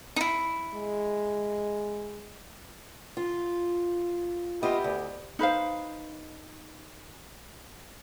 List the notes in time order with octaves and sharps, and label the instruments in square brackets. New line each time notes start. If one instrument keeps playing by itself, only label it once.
[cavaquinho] D#4 E4
[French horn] G#3
[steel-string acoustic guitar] F4
[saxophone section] B3 E4 G4 [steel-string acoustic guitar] F4 D#5
[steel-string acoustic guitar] D2
[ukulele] D#4 B4 C5 F5